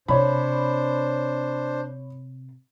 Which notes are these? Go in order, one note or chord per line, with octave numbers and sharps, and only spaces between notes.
C3 D4 C5 C#5 B5